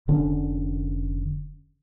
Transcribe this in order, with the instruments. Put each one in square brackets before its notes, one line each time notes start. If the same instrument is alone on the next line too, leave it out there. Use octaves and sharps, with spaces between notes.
[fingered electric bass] F1 D3 C#4 D4